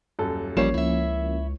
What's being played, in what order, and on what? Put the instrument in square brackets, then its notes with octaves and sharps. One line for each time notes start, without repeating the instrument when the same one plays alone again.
[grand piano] D#1 F#2 A4
[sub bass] A1 [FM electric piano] F3 A#3 C#4 [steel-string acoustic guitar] G3 [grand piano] C#5 C7 E7
[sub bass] C#2 [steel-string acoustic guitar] E4 E5